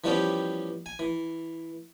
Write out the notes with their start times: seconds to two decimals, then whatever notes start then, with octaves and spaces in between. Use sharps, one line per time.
0.04 E3 F3 G3 B3 C#4 G4
0.86 G#5
0.99 E3